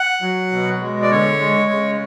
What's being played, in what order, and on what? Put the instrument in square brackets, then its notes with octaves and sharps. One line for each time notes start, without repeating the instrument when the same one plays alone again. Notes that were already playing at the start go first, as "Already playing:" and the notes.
Already playing: [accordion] F#5
F#3
B2
G#3
D5
D3 C#5
G#3
C#3